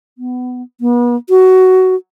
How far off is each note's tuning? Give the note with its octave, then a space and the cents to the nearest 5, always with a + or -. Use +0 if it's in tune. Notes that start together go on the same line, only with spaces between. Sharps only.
B3 +20
B3 -40
F#4 +15